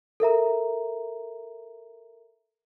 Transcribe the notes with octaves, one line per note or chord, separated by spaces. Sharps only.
A4 A#4 E5 A#5